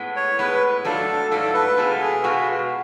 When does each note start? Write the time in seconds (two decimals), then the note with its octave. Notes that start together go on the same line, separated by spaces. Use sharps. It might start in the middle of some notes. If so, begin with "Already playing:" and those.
Already playing: A2 G#3 B3
0.16 C#5
0.39 A2 G#3 B3 B4
0.85 G#2 F#3 A3 D4 F4 A4
1.31 G#2 F#3 A3 D4 F4 A4
1.54 B4
1.77 B2 G#3 B3 F4 A4
2.00 G#4
2.23 B2 G#3 B3 F4 F#4